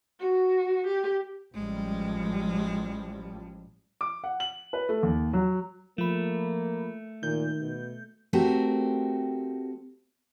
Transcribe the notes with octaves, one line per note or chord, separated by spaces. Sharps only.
F#4
G4
A1 F3 G3 G#3
D6
F#5
F#7
B4
A3
D#2
F#3
F3 A3 A#3 B5
A#2 D#3 G6
B2
A3 C4 F#4 G4 A#4